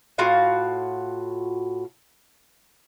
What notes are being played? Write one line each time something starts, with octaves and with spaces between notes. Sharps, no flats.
A2 F4 F#4 F5